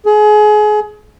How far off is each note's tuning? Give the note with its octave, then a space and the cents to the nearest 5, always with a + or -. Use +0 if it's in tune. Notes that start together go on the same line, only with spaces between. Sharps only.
G#4 +30